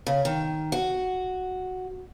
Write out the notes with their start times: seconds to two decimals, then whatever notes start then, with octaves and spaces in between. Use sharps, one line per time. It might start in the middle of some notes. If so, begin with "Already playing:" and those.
0.07 C#3
0.25 D#3
0.72 F#4